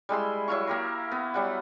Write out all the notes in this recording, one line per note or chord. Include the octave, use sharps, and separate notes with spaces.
G3 G#3 E4 C6
F#3 E4 F5 C#6
A#3 G4 A#4
B3
F#3 G3 F#5